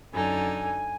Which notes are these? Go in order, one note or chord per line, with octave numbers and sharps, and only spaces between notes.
F#2 D3 D#4 G#5